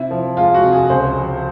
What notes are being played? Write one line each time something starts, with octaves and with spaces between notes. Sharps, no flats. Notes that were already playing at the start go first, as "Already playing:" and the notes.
Already playing: C3 E4
F3
G#3 F4
F#4
C3
G#4
C#2 C5
F3